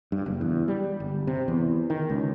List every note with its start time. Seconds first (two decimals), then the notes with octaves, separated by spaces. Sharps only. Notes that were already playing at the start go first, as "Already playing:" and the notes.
0.12 G2
0.26 F#1
0.41 E2
0.68 G3
1.00 G1
1.27 C3
1.48 E2
1.90 D#3
2.10 C#2